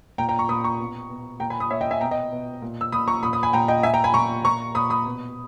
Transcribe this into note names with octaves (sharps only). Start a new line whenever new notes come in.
A#2 G5 A#5
G5 A#5
A#5 C#6
A#2 B5 D#6
A#5 C#6
B2
B2
A#2 G5 A#5
G#5 B5
B5 D#6
A#2 C#5 E5
D#5 G5
E5 G#5
B2 G5 A#5
D#5 G5
B2
A#2
E6
A#2 B5 D#6
A#5 C#6
A#2 B5 D#6
B5 D#6
G#5 B5
A#2 G5 A#5
D#5 G5
A#2 E5 G#5
G5 A#5
G#5 B5
A#2 A#5 C#6
A#2 A#5 C#6
A#2 B5 D#6
B5 D#6
B2